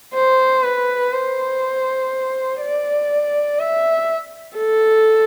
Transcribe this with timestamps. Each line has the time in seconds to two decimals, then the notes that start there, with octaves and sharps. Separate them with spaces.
0.14 C5
0.63 B4
1.13 C5
2.60 D5
3.59 E5
4.57 A4